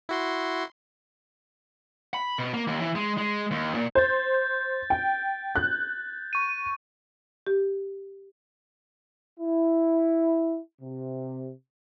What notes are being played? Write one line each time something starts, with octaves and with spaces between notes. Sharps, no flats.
E4 F#4 C6
B5
B2
A#3
D#2
E3
G#3
G#3
D#2
A#2
C5 G6 A6
G5
F#6
C#6 D#7
G4
E4
C3